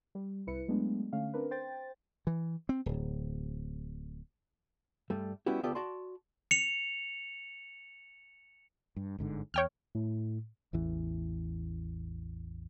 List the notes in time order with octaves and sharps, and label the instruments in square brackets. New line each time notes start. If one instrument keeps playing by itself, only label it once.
[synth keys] G3
C2 E4 B4 C#7
F#3 G#3 A3 B3 D4
D3 A3 C#4 F5
C4 D4 A#4 B4
C5 G5 A6
[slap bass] E3
C4
D1
[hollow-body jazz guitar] G2 G3 A3
G3 B3 C#4 E4 F#4 G4
D2 B3 F4 G4 A4 D5
F#4 D5 A5 C6
[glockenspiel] C#7 F7
[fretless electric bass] G2
G1 G#2 D3
[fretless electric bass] E2 [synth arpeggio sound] C#5 G5 F6
[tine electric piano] A2
[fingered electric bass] A1 E2 E3